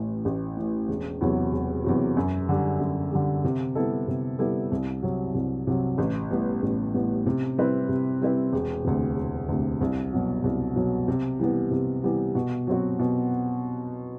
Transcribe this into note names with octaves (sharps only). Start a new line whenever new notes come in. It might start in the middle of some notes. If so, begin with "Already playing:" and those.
Already playing: A1 A2 E3
A1
A2 E3
E1
E2 C3 F#3
E1
E2 C3 F#3
F#2
D3 G3
F#2
D3 G3
C3
G3 B3 E4 A4
C3
G3 B3 E4 A4
C2
C3 F#3
C2
C3 F#3
A1
A2 G3 B3
A1
A2 G3 B3
C3
G3 C4 E4 B4
C3
G3 C4 E4 B4
E1
D2 C3
E1
D2 C3
C2
B2 F#3
C2
B2 F#3
C3
E3 G3 B3
C3
E3 G3 B3
B2
F#3 C4 F#4
B2